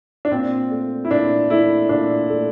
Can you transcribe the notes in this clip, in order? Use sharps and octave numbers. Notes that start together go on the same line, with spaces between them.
D4
A#2 C4
A3
E4
A#2 D4
A3 E4
A#2 D4
A3